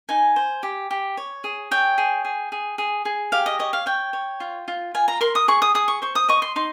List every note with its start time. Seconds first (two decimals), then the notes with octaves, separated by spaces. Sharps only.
0.09 D#4 G#5
0.36 C5
0.63 G4
0.91 G4
1.17 C#5
1.44 G#4
1.71 C#5 G5
1.98 G#4
2.25 G#4
2.52 G#4
2.78 G#4
3.05 G#4
3.32 G4 F5
3.46 D#5
3.59 C#5 D#5
3.73 F5
3.86 C#5 G5
4.13 C#5
4.40 F4
4.68 F4
4.94 F4 G#5
5.08 A#5
5.21 A#4 C6
5.35 D#6
5.48 G#4 C#6
5.62 D#6
5.75 G#4 D#6
5.88 C#6
6.02 C5 C#6
6.15 D#6
6.29 D#5 C#6
6.42 C6
6.56 D#4 C6